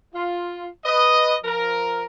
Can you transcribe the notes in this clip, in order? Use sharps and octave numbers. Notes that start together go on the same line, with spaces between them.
F4
B4 D#5
F3 A#4